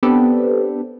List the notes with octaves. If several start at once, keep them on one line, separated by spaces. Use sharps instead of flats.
B3 C4 D4 G4 A4 B4